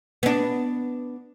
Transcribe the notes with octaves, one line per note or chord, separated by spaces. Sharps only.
B3 D4